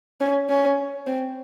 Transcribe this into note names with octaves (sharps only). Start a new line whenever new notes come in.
C#4
C#4
C4